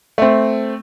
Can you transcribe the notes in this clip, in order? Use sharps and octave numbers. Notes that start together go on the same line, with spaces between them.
A3 C4